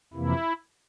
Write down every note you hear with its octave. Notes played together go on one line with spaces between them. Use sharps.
F2 C3 E3 A#3 E4